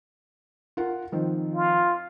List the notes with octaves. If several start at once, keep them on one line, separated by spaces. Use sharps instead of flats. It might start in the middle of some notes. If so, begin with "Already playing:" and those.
F4 A#4 F#5
D#3 F3 C4
F4